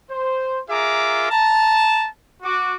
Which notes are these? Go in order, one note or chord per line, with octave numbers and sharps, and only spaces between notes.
C5
F4 G#4 A#4 E5 A#5 D6
A5 A#5
F#4 D6